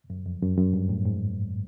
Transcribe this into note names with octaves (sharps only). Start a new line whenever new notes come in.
F#2
F2
F#2
F#2
G2
A2
G#2